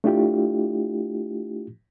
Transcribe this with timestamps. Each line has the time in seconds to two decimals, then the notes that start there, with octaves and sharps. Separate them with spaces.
0.04 A3 D4 E4 F4 G4